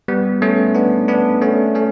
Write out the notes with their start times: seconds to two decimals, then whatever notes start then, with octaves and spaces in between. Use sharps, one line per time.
0.08 G3 B3
0.42 A3 C#4
0.75 B3 D4
1.08 B3 D4
1.41 A3 C#4
1.75 A3 C#4